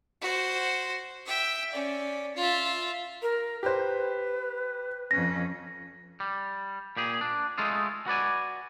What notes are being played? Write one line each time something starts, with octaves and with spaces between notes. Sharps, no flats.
F#4 C5
E5 G5
C#4 D5
F4 E5
A#4
G4 B4 C5
F2 C#4 A#6
G3
A#2 G4 G#4
D4
G#3 A3 D#4 F4 G#4
F#4 B4 D5 G#5